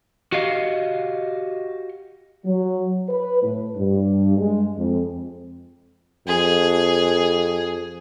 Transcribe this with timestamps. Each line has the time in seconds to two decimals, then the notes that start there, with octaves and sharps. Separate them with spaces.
0.32 F#4 G4 D#5 F5
2.45 F#3
3.09 B4
3.43 A2
3.76 G2
4.38 G#3
4.77 F2
6.27 F2 G#4